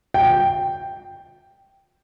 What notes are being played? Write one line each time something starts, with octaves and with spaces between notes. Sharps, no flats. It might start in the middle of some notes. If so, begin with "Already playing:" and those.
G5